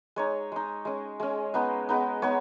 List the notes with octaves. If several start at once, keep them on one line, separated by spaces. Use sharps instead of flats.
G#3 D#4 C#5
G#3 D#4
G#3 C#4
G#3 C#4
G#3 B3 D#4
G#3 B3 D#4
G#3 B3 D#4 C#5